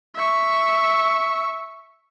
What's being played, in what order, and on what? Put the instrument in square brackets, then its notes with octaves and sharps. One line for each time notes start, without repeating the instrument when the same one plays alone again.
[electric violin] E5 C#6